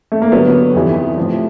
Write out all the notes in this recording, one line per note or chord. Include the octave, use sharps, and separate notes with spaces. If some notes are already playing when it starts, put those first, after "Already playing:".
A3
A#3
G2 D3 F#3 B3
F2 C3 E3 G3
A2 F3